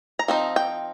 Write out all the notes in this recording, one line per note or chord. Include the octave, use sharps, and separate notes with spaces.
A#5
F3 C4 D#4
G5